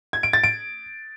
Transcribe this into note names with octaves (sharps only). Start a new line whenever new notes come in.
G#6
D7
A6
D7